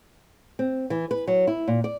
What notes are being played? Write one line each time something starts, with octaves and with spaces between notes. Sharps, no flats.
C4
E3
B4
F#3
E4
A#2
D5